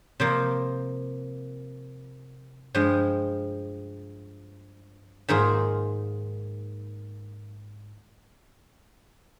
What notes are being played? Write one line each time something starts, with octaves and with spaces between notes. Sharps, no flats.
C3 F3 A#3
G2 F3 G#3
G#2 D#3 A#3 F4 G#4